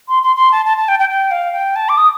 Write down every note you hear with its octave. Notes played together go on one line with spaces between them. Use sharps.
C6
C6
C6
A5
A5
A5
G5
G5
G5
F5
G5
A5
D6
D#6